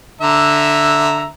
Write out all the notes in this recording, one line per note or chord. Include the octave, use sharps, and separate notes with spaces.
D3 E5 A#5